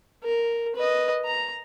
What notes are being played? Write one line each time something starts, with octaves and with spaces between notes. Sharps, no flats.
A#4
B4 D#5
A#5